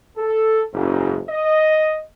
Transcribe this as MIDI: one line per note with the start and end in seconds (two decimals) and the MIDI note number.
0.17 0.62 69
0.73 1.16 30
0.73 1.16 44
1.28 1.97 75